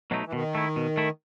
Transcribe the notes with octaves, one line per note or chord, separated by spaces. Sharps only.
B2 F#3 A3 D#4
E3
B2 D#3
A3 E4
B2
A3 E4